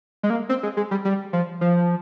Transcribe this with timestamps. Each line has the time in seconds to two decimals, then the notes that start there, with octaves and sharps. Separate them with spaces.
0.23 G#3
0.30 A#3
0.49 C4
0.63 G#3
0.77 G#3
0.91 G3
1.05 G3
1.33 F3
1.61 F3